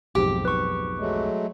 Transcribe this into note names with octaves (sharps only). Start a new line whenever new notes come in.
B1 F2 G#2 G4 D6
B4 C#6
F#3 G#3 A3